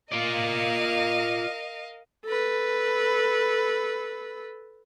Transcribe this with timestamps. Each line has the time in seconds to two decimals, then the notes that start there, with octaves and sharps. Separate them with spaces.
0.12 F4 A#4 D5 D#5 F5
2.25 A4 B4